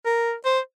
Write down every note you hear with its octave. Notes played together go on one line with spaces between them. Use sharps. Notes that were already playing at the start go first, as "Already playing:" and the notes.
A#4
C5